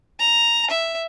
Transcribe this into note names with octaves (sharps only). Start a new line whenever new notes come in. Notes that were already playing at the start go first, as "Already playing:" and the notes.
A#5
E5